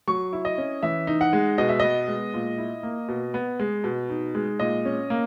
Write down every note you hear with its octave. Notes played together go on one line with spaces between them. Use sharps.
F#3 C#6
E4
D#5
C#4
E3 E5
D#4
F#5
G#3
B2 D#5
E5
B3 D#5
G#3
A#2
E4
A#3
B2
B3
G#3
B2
D#4
G#3
A#2 D#5
C#4
A#3